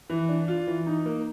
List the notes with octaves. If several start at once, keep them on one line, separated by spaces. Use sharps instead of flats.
E3
D4
F4
E3
D#4
A#3